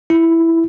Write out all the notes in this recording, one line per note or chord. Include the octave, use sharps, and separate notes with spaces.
E4